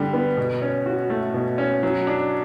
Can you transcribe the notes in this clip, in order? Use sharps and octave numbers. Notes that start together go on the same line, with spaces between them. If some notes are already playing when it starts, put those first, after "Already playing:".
Already playing: D3 G3
B3
B2
C#4
F#4
A3
B2
C#4
F#3
D4